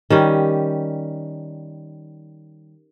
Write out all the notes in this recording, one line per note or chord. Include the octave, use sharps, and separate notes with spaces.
D#3 G3 C#4